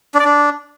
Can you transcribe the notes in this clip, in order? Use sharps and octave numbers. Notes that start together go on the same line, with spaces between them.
D4
D5
D4